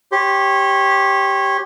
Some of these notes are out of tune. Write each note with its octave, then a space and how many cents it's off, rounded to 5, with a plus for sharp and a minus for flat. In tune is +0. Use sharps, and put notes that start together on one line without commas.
G4 +0 C#5 -20 C6 +0